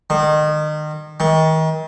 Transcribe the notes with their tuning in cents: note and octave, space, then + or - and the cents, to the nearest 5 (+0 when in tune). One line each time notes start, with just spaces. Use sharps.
D#3 -30
D#3 +35